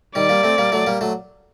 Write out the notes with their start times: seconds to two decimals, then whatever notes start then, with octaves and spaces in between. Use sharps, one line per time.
0.15 D#3 G3 D5
0.29 G3 A#3
0.43 A3 C4
0.58 G3 A#3
0.72 F#3 A3
0.86 G3 A#3
1.01 F#3 A3